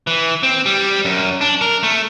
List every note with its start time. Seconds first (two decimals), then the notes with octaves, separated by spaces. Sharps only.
0.07 E3
0.43 C4
0.66 G3
1.05 F#2
1.41 D4
1.61 A#4
1.83 A3